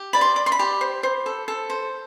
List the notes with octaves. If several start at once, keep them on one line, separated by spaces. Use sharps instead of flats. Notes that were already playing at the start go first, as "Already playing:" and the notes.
Already playing: G4
D5 B5
C6
D5
C6
B5
G4
C5
C5
A4
A4
C5